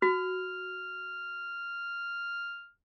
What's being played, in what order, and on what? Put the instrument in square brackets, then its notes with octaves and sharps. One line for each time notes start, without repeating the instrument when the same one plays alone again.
[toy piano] F#4 [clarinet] F6